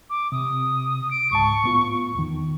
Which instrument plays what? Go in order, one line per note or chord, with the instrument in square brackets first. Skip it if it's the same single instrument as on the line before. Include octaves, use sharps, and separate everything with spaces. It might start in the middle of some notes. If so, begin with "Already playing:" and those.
[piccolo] D6
[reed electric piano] C3 [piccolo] D#6
[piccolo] D7
[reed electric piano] C#2 G#2 A5 [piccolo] C#6
[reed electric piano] A2 B3 F4
E2 D#3